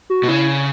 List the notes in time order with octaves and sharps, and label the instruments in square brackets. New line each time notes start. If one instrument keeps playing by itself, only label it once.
[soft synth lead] F#4
[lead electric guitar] B2
[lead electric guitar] C#3 [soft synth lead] E4